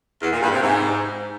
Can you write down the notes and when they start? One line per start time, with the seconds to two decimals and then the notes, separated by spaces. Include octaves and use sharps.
0.22 E2
0.32 A#2
0.42 G2
0.52 C3
0.62 G#2